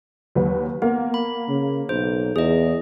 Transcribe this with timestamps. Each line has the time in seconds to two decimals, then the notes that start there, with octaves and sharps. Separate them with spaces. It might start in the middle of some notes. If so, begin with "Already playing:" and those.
0.35 D#2 F#3 B4
0.82 A#3 B3
1.14 B5
1.48 C#3
1.89 B1 C5
2.36 E2 G#4 D#5